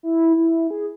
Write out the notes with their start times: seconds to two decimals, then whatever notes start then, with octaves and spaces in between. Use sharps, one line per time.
0.03 E4
0.37 E4
0.71 G#4